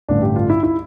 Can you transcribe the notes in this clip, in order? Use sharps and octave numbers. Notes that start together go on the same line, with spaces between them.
A1 G2 D3 A3 D4
G4
F4
E4
E4